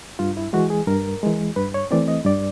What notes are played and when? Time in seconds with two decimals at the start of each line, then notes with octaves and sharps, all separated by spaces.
0.19 G2 F4
0.37 E4
0.53 E3 G#3 F#4
0.70 G#4
0.87 G2 A#4
1.23 E3 G#3
1.56 G2 B4
1.74 C#5
1.91 E3 A3 C4 D5
2.08 D#5
2.25 G2 D5